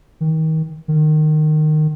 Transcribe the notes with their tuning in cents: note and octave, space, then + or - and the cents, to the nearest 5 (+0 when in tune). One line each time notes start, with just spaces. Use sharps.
D#3 +30
D#3 -20